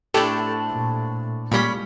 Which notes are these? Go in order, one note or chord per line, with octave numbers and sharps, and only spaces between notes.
A2 A3 C4 D4 G4 A4
A#2
A#2 G3 G#3 C#4 B5 B6